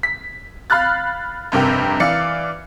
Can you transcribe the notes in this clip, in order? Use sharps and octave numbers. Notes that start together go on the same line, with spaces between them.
B6
F5 B5 F6 F#6 A6
F1 G2 C3 A#4 G5
E3 D5 F5 C#7